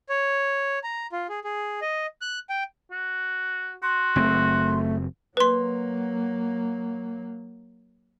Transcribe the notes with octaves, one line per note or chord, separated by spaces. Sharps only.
C#5
A#5
F4
G#4
G#4
D#5
F#6
G5
F#4
F#4 C6
F#1 A3 C4
F#3 A#3 B4 C6